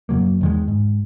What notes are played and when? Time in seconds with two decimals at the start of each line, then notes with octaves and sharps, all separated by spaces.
0.09 F#2 C#3 F#3 A#3
0.41 E2 D#3 G#3
0.68 G#2